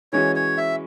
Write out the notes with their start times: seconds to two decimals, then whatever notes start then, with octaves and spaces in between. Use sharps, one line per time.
0.13 E3 G#3 C#4 F#4 C#5
0.36 C#5
0.57 E5